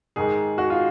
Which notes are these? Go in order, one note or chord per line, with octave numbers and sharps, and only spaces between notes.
G#2 D#3 G#3 G#4
F#4
F4